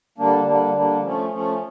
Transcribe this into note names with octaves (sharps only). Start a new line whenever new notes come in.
D3 G3 A#3 D4
D3 G3 A#3 D4
D3 G3 A#3 D4
F3 A3 C#4
F3 A3 C#4